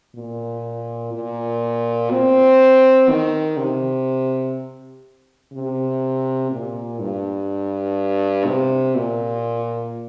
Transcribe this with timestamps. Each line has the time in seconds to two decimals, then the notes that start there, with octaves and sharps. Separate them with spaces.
0.15 A#2
1.13 A#2
2.11 C4
3.09 D#3
3.57 C3
5.53 C3
6.51 A#2
6.99 G2
8.46 C3
8.95 A#2